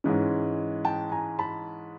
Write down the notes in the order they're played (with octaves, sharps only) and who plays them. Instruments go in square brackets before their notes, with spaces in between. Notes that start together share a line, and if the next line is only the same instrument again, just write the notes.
[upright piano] G#2 E3 G#3 C#4
G5 A5
G#5 A#5
A5 B5